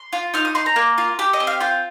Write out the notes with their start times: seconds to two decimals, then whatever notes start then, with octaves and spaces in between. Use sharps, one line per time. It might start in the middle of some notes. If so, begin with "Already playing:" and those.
Already playing: C6
0.13 F4
0.34 D#4 F6
0.45 D#6
0.55 D#4 C6
0.66 A#5
0.76 A#3
0.98 F4
1.19 G4
1.33 D#5
1.40 C4
1.47 F5
1.61 F4 G5